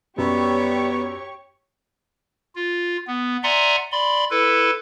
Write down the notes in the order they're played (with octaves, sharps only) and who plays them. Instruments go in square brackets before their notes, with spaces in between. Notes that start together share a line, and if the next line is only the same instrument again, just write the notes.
[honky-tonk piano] F#2 [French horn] G3 [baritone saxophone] B3 [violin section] G4 C#5 C#6
[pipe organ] F4
B3
D5 E5 F#5 G#5 A#5 C6
D5 B5 C6
E4 A4 B4